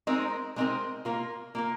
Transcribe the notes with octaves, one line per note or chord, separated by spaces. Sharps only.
G#3 C4 D#4 A#4
G#3 C4 D#4 A#4
A#3 F4 A#4
A#3 F4 A#4